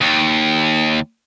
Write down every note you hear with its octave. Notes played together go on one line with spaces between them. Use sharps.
D#2